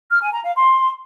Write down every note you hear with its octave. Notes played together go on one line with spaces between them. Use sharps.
F6
G#5
A#5
F5
C6